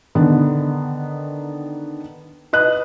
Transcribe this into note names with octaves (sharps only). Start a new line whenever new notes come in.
D3 D#3 B3
B4 D#5 F#6